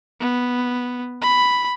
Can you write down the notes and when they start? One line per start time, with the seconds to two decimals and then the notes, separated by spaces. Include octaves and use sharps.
0.20 B3
1.22 B5